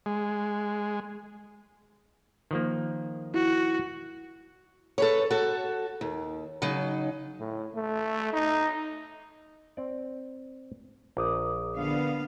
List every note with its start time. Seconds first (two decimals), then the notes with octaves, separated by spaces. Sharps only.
0.06 G#3
2.51 D#3 F3 A#3
3.34 E4 F#4
4.98 A4 B4 C#5
5.30 F#4 A4
6.01 D#2
6.62 C#3 F#3 D#4
7.39 A2
7.75 A3
8.33 D#4
9.77 C4 D5
11.17 A#1 A#4 D6 D#6
11.75 D3 B3 F5